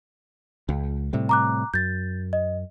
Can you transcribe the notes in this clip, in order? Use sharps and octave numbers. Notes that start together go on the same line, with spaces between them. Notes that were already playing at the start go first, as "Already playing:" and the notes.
C#2
A2 C3 G3
A#5 D6 F#6
F#2 G6 A6
D#5